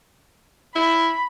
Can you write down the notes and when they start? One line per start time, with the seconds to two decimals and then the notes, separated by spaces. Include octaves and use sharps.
0.75 E4 B5